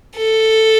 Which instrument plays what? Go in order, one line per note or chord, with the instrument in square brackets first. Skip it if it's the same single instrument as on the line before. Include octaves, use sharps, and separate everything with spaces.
[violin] A4